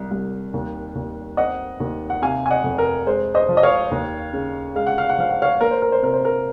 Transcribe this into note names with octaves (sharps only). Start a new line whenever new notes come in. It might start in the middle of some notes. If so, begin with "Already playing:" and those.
Already playing: C2
C2
D#2
D#2
C4 D#5 F#5
D#2
F#5
C3 F5 G#5
G#5
D#5 F#5
F2
A#4
G#3 C5
C5 D#5
F3
D#5
C#5 F5
D#2
C#3
G#3 F5
F#5
F5
F#5
F3 F5
F#5
C#5 F5
A#3 A#4
C5
A#4
C5
C3 A#4
C5
A#4